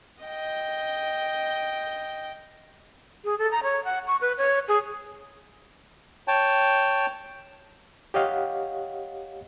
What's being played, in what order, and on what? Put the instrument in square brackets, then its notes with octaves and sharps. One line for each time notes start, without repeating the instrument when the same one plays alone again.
[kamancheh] D#5 G5
[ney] G#4
A4
A#5
C#5
F#5
C#6
B4
C#5
G#4
[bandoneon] C#5 G5 A5
[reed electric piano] G4 C#5 D#5 F5 F#5